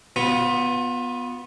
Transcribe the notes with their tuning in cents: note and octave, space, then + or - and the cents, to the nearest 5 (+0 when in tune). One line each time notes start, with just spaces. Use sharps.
B3 +0 F4 +30